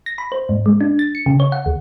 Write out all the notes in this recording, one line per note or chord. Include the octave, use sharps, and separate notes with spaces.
A#6
B5
C5
G#2
G#3
D4
A6
C#7
C#3
C#5
F#5
D2